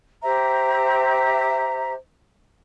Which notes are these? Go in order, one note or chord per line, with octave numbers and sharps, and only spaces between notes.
G4 C5 E5 A#5